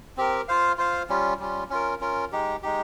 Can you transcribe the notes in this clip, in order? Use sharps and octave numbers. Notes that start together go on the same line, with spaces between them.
C4 G4 A#4
F4 C5 F5
F4 C5 F5
G3 C#4 F4
G3 C#4 F4
C#4 F4 A#4
C#4 F4 A#4
G#3 D#4 G4
G#3 D#4 G4